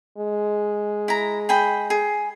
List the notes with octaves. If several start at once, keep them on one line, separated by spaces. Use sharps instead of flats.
G#3
E4 A#5
G#4 G5 B5
G#4